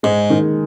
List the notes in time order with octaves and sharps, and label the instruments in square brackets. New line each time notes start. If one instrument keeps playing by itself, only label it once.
[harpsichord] G#2 [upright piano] G#3
[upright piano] D#3